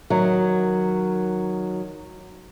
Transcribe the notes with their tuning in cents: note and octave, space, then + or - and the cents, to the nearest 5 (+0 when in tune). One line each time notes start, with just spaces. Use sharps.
D#3 +0 F#3 +0